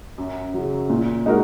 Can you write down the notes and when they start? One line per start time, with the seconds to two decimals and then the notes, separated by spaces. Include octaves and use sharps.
0.18 F#2
0.54 C#3 F#3
0.90 A#2
1.26 G#3 D#4 F#4 A#4